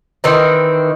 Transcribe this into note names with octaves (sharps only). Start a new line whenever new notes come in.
D#3 E3 C4